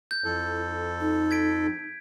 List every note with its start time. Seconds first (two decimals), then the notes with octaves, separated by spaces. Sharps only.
0.11 G6
0.24 F2 E4 A4
1.00 D#4
1.31 G#6 B6 D7